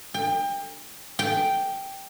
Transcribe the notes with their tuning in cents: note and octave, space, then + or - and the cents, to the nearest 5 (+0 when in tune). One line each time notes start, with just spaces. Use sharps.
G5 +30
G5 -5